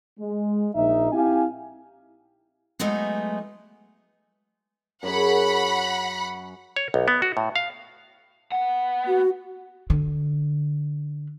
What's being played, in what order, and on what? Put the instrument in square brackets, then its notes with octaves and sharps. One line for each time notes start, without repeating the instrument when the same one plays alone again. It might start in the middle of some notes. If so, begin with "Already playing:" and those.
[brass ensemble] G#3
A#1 D#4 E5
C4 E4 G4 F5 G#5
[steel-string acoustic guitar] F#3 G#3 A3 B3 D#4
[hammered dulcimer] F#2 F#3 G#4 [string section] F#5 B5
[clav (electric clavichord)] C#5
B1
B3
F#4
A2
F5
[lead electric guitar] B3 F#5
[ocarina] F#4
[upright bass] D3